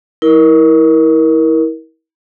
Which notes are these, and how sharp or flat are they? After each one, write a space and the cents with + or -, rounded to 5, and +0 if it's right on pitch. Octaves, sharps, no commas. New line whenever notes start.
E4 -30 A#4 +15